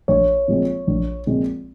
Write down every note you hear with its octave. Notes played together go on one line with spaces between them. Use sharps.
A#1 C#5
A#2 F3 G#3 C4
A#1
A#2 F3 G#3 C4